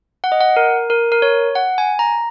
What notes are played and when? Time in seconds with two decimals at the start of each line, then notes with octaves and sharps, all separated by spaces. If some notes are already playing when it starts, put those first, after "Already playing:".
0.24 F#5
0.32 D#5
0.41 F#5
0.56 A#4
0.90 A#4
1.12 A#4
1.22 C#5
1.55 F#5
1.78 G#5
1.99 A#5